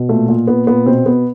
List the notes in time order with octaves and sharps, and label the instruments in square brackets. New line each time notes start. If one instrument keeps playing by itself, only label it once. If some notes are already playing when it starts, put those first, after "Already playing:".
Already playing: [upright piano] B2
A#2 A3
A#2
A#2 B3
A#2 B3
B2 C4
B2 B3